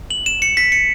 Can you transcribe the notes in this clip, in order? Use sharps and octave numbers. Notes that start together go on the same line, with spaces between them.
F#7
E7
C#7
B6
C#7